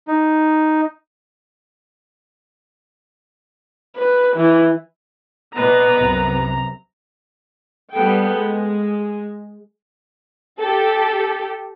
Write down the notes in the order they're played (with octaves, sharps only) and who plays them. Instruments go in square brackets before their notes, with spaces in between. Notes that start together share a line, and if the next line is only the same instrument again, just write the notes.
[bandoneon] D#4
[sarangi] B4
E3
[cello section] B2 D5 D#5 [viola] B3 B4 [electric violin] A#5
[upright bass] C2 [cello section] F#2 C3
[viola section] G3 B3 A4 G5
G#3
[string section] G4 A4